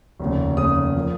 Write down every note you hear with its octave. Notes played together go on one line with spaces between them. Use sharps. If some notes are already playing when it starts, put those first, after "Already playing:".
F1 D#2 C#3
F1 D#2 C#3 D#6
F3 A#3